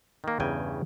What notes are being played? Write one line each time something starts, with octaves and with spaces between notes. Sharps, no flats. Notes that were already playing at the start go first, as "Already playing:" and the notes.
D#3 A#3
E2 G2 C#3 G5 G#5